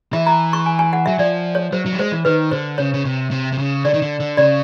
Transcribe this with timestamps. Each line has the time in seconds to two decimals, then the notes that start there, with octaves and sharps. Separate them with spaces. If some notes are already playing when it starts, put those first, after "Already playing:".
0.13 E3 E5
0.26 A#5
0.53 C#6
0.66 G#5
0.79 G#5
0.93 F#5
1.06 F#3 E5
1.19 F3 D5
1.55 C#5
1.72 F#3 C5
1.86 F#3
1.92 G3
1.99 G#3 C5
2.12 E3
2.25 D#3 B4
2.51 D3 C5
2.78 C#3 C#5
2.94 C#3
3.05 C3
3.31 C3
3.52 C3
3.58 C#3
3.85 D3 D5
3.94 D#3
4.02 D3
4.20 D3
4.37 C#3 D5